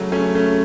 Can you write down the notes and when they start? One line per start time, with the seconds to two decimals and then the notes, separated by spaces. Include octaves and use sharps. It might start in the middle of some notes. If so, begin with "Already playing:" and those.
Already playing: C#3 F#3 A3
0.12 A3 C#4
0.35 A3 C#4